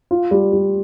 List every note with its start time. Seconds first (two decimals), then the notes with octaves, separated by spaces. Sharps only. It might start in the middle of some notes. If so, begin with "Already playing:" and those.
0.11 F4
0.31 G3
0.53 G3